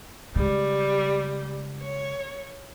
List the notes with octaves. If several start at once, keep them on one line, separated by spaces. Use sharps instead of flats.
C#3 G3 G#3
C#5